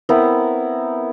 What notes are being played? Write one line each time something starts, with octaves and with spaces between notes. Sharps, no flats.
B3 C4 E4 A#4